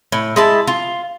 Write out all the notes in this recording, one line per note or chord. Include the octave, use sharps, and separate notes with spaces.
A2
G#3 E4 A5
F4